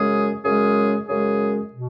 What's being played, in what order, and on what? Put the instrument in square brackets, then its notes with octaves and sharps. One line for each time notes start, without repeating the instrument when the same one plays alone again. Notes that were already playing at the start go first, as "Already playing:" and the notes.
Already playing: [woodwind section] F#2 C#3 G#3 C#4 G#4
F#2 C#3 G#3 C#4 G#4
F#2 C#3 G#3 C#4 G#4
B2